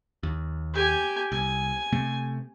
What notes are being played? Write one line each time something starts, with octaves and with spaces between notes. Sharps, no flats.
D#2
G4 G#5
C2 G#5
C3 A3 C4